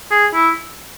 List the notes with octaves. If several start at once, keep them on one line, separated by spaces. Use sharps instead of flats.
G#4
E4